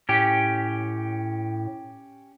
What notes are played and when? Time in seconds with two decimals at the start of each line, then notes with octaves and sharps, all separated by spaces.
0.09 A2 C#4 G4